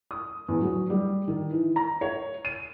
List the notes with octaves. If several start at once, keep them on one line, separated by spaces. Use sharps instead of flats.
D#6
E2
F#3
G3
D#3
E3
A#5
C#5
D#7